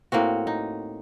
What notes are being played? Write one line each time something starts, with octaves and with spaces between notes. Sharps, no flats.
A2 A#3 C4 F#4
D#4